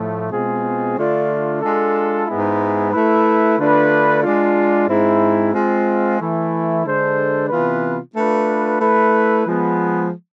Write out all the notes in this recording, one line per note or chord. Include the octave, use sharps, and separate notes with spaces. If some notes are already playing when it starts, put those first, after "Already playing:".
Already playing: A2 F3 A3
B2 G#3 C4 F4 G#4
D3 A3 D4 F4
G#3 D4 F4 A4
G#2 G#3 B3 E4
A3 E4 B4
D3 A3 D4 F4 B4
G#3 D4 F4
G#2 G#3 C4 E4
G#3 C4 F4
E3 A3 E4
D3 G#3 D4 A4 C5
C3 E3 B3 F4 B4
A3 D4 F4 B4
A3 E4 B4
F3 G#3 B3